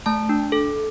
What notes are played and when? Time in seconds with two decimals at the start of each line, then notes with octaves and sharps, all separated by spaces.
0.06 A3 A5
0.29 D4
0.52 A4